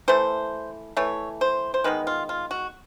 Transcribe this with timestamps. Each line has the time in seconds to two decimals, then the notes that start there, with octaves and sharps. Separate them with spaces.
0.08 E3 A3 C5
0.97 E3 A3 C#5
1.41 C5
1.74 C5
1.84 D#3 G#3 B3 B4
2.07 F4
2.29 F4
2.51 F#4